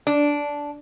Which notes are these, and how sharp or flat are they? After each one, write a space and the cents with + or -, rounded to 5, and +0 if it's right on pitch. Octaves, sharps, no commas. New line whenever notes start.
D4 -10